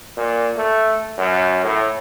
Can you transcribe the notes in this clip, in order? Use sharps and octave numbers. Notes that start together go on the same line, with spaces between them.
A#2
A3
F#2
A2